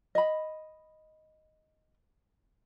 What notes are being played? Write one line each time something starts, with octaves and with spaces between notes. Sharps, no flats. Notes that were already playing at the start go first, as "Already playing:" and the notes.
D#5 B5